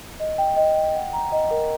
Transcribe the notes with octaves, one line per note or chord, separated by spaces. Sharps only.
D#5
G5
D#5
G5
F#5
A#5
D#5
A#4